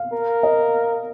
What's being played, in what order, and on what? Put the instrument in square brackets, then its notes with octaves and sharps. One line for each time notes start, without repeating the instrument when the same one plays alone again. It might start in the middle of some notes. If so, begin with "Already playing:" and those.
Already playing: [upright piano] F5
[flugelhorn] A#4
[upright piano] D#5